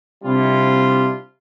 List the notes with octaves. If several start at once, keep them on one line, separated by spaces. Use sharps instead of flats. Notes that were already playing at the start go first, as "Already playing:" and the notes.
C3 G3 C4 D4 E4 F4